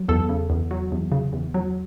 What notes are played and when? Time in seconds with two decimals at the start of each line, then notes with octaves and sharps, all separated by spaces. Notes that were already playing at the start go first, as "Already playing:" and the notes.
Already playing: F#3
0.09 E2 A4
0.29 C#3
0.50 E2
0.71 F#3
0.92 E2
1.12 C#3
1.33 E2
1.54 F#3